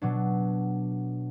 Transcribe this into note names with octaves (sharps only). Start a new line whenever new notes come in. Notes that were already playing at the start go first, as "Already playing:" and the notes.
B2 F#3 D4